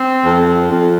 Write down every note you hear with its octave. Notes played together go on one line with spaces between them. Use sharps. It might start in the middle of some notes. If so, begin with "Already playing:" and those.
Already playing: C4
F2
F2